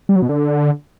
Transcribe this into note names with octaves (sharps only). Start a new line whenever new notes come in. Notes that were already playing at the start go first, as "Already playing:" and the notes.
G3
F#3
B2
D3